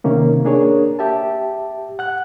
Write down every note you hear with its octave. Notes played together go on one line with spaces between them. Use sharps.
C3 D#3 A#3 C#4
A#3 D4 G#4 A#4 C#5
G4 E5 A5
F#5 F#6